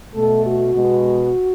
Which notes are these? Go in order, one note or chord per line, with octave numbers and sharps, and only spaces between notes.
B2 A3 A4
F#4
B2 G#3 B3